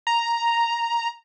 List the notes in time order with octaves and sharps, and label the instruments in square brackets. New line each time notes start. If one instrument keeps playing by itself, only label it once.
[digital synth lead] A#5